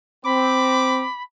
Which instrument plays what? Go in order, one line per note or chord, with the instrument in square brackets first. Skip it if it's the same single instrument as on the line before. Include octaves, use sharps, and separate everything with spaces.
[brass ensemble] C4 [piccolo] B5 [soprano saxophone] D6